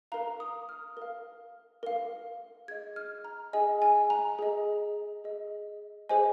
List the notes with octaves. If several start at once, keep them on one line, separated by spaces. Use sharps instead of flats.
A#4 F5 A#5
D#6
F6
A#4 F5
A#4 F5
G#4 D#5 G#6
F6
A#5
G#4 D#5 G#5
G#5
A#5
G#4 D#5
G#4 D#5
G#4 C5 D#5 G#5